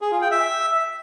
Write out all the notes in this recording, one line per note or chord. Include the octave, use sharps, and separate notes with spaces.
G#4
F4
G5
E5